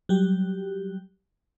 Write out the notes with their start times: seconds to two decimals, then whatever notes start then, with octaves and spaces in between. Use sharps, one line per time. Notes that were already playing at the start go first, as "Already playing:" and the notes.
0.09 F#3 G3 G4